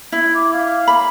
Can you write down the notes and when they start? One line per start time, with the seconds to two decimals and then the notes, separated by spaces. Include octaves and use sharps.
0.12 E4 G#6
0.34 D6
0.53 F5
0.88 B5